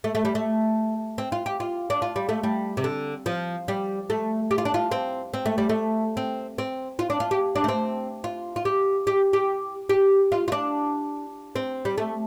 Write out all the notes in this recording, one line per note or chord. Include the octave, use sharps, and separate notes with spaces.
A3
A3
G3
A3
C4
F4
G4
F4
D4
F4
G3
A3
G3
C3
D3
F3
G3
A3
G4
F4
D4
F4
C4
C4
A3
G3
A3
C4
C4
F4
D4
F4
G4
D4
A3
C4
F4
F4
G4
G4
G4
G4
F4
F4
D4
C4
G3
A3